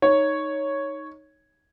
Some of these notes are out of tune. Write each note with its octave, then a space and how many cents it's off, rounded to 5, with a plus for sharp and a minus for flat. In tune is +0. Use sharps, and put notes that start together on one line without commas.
D#4 +0 C#5 +0